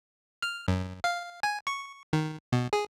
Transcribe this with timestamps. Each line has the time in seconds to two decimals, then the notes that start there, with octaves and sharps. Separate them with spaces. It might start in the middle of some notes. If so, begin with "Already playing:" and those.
0.42 F6
0.68 F#2
1.04 F5
1.43 G#5
1.67 C#6
2.13 D#3
2.52 B2
2.73 G#4